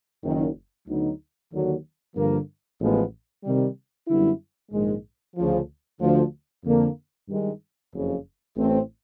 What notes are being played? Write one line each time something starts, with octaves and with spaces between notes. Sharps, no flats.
F#1 F#2 D#3
D2 D3 F#3 B3 D#4
D#2 D3 F#3
G2 D3 F3 A#3
A1 A2 F3 G#3 B3
C3 D#3 G3
F#2 D3 G3 B3 E4
A#1 G#2 D#3 G#3
D2 C#3 F3
D2 D3 F3
F2 D3 F3 A#3 D4
G2 D#3 G#3
F#1 F2 C#3 F3
A1 A2 E3 A3 C4